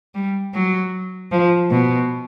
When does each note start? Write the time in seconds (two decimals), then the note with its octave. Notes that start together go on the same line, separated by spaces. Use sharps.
0.15 G3
0.54 F#3
1.31 F3
1.71 B2